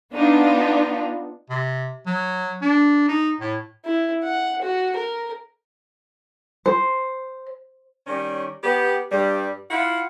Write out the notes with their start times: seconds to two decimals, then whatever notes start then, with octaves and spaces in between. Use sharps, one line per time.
0.14 B3 D4 D#4 F4
1.50 C3
2.06 F#3
2.62 D4
3.09 D#4
3.40 A2
3.85 E4
4.23 F#5
4.62 F#4
4.96 A#4
6.66 C5
8.07 D#3 G3 C#4
8.64 B3 G4
9.12 G2 G3
9.71 E4 F4 F5 F#5